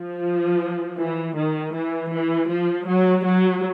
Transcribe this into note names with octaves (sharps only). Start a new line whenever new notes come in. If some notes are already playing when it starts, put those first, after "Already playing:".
Already playing: F3
E3
D#3
E3
E3
F3
F#3
F#3